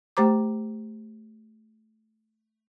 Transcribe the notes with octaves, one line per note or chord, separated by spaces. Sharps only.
A3 G4 C5 A#5 D6